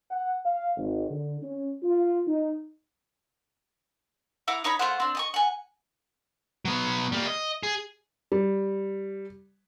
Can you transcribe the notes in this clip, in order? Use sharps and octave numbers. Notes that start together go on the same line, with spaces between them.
F#5
F5
G#1
D3
C#4
F4
D#4
E4 F#5 A#5 D6
D#4 C#5 A#5 B5
A3 F4 C5 F#5
C4 D4
D#5 G5 C#6
F#5 G#5
F#3 B3
G3 A#3
D#5
G#4
G3